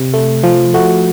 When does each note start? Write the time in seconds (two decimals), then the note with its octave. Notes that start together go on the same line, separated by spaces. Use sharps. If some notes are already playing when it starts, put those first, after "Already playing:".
Already playing: C3
0.14 A3
0.44 F3
0.74 A3 F#4